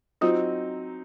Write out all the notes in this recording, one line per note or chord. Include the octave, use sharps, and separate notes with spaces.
F#3 C4 D#4 F4